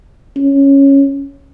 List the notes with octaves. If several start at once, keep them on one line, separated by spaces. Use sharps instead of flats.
C#4